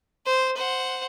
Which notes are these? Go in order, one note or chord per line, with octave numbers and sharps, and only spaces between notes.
C5
C5 F#5